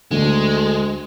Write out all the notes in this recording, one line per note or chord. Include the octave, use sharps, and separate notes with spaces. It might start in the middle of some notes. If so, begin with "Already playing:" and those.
D2 D3 G#3 A3